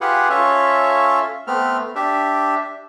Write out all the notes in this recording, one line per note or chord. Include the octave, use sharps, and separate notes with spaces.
F4 G4 G#4 B4 F#5
C#4 F4 A4 C#5 E5
A3 B3 C4 F6
D4 G4 E5